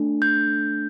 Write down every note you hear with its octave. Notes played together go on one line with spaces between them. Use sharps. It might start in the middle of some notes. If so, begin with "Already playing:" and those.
Already playing: A3 D4 A4
G6